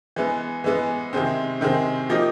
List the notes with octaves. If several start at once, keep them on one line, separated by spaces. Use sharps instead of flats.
E3 G#3 B3
E3 G#3 B3
C3 D#3 G#3 C4
C3 D#3 G#3 C4
F3 A#3 D#4 G4